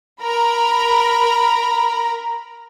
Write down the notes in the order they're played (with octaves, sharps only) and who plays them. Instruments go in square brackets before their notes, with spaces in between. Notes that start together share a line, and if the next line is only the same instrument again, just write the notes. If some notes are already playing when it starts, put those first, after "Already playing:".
[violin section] A#4 A#5 B5